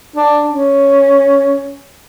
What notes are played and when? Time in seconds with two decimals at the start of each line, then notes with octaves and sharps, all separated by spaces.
0.16 D4
0.50 C#4